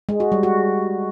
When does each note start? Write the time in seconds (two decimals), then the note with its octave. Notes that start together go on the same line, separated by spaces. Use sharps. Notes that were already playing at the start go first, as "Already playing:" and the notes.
0.09 G#3
0.20 F#4
0.32 G3
0.43 F#4